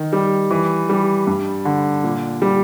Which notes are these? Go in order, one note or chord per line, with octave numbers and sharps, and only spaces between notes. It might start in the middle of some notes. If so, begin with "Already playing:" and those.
Already playing: D#3
G3
E3
G3
G2
D3
A#2
G3